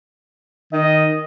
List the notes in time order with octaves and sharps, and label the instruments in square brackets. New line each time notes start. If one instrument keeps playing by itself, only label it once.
[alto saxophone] D#3 [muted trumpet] D#5